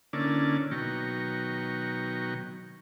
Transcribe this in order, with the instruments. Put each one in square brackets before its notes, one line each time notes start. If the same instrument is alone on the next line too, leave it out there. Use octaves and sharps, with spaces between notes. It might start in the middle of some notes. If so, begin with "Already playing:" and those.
[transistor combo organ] D3 A#3 C#4 E4 D5 A5
B2 D#3 F#3 G5 A#5 C#6